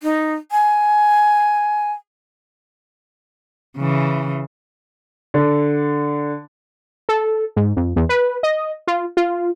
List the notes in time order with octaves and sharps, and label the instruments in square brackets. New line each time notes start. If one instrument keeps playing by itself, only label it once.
[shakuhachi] D#4
G#5
[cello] C#3 E3
[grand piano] D3
[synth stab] A4
G#2
F2
E2
B4
D#5
F4
F4